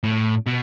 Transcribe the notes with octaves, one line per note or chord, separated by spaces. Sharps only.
A2
B2